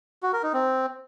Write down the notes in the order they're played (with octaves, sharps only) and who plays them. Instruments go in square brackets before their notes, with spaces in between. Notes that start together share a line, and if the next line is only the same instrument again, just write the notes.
[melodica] F#4
A#4
D#4
C4